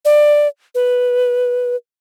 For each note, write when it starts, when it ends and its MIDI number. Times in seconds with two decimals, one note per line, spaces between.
0.05 0.48 74
0.75 1.76 71